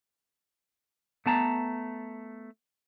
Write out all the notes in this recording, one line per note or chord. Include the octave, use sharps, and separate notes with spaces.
A3 B3 A5 A#5